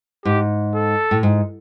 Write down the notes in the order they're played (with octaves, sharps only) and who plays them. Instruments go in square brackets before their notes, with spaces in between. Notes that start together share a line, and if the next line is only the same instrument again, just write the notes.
[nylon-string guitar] G#2 [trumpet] G4
[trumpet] A4
[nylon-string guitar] A2
G#2